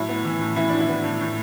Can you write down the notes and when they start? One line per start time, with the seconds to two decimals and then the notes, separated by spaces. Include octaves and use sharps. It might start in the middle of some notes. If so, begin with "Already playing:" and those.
Already playing: A2 F#3 E4
0.08 B3
0.25 E3
0.40 A2
0.56 E3 E4
0.69 A2 D4
0.80 E4
0.88 B3
1.03 A2
1.20 A2